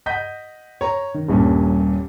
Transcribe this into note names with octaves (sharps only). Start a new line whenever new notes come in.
D#5 F#5 G6 B6
C#5 A#5
D#3
D#1 G2 A#2 C#4